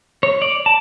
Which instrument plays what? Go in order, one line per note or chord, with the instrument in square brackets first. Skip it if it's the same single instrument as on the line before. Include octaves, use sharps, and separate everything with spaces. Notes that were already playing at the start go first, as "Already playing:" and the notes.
[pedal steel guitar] C#5
D5
A5